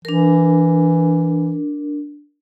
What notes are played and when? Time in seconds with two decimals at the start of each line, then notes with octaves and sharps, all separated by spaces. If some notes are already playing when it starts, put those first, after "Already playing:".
0.05 E3 D4 A#4